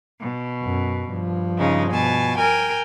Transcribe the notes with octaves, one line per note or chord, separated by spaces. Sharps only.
B2
F#2
G2 F3
C#3 G#3 D#4
B2 G#5 A5
A#4 G5 G#5